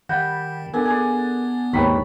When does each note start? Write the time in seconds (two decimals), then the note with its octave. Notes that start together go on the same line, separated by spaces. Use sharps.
0.09 D#3 G3 F5 F#5 G6 A#6
0.74 B3 D4 A4 A#4 G#5
0.86 D4 G#4 D5 G#5
1.73 D#2 G#2 B4 C#5 G5 A#5 B5 C#6